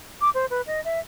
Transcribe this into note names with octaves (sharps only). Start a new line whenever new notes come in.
D6
C5
B4
D#5
E5